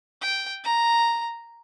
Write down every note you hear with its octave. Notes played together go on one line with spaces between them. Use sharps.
G5
A#5